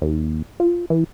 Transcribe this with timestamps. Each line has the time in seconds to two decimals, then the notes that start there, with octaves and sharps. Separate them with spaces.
0.02 D#2
0.60 F4
0.90 E3